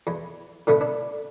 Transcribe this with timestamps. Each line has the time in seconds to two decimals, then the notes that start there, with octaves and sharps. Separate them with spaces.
0.07 E2
0.67 A2 D3 A3 B3
0.81 D4